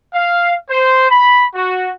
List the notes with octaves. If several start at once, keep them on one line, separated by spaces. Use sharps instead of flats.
F5
C5
B5
F#4